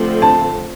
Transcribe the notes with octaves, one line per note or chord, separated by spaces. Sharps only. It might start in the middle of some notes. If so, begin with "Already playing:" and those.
Already playing: D3 F3 A3 C4
A5